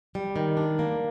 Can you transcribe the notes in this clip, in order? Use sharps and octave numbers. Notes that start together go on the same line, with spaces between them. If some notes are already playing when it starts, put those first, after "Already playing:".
G3
D#3
D4
A#3